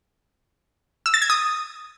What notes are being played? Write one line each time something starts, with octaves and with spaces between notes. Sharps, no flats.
E6
A6
G#6
D#6